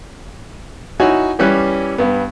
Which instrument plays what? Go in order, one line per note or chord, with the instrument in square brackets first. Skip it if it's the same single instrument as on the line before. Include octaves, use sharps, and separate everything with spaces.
[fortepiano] D#4 E4 F#4 C#5 G#5
E3 G3 C#4 D5 F#6
G2 B3